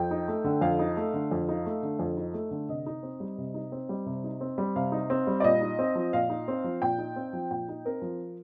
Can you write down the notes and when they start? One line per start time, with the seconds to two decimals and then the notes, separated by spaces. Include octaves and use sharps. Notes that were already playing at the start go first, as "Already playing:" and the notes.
Already playing: F2 G5
0.11 D#4
0.28 A3
0.44 D3
0.61 F2 F5
0.79 D#4
0.97 A3
1.14 D3
1.31 F2
1.49 D#4
1.66 A3
1.83 D3
1.99 F2
2.17 D#4
2.34 A3
2.51 D3
2.69 C3 D#5
2.86 D#4
3.03 C4
3.20 G3
3.38 C3
3.54 D#4
3.72 C4
3.89 G3
4.06 C3
4.24 D#4
4.41 C4
4.58 G3
4.76 C3 F5
4.92 D#4
5.10 C4
5.27 G3
5.40 D5
5.44 A#2 D#5
5.61 D#4
5.79 C4
5.95 F3
6.13 A#2 F5
6.30 D#4
6.48 C4
6.64 F3
6.82 A#2 G5
6.98 D#4
7.16 C4
7.33 F3
7.51 A#2 G5
7.69 D#4
7.85 C4 A#4
8.02 F3